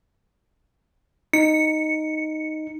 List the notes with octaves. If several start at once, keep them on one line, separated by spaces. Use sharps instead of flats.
D#4 C#7